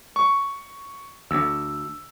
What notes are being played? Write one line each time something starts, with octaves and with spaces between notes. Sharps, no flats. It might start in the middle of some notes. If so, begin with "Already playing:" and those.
C#6
D2 E6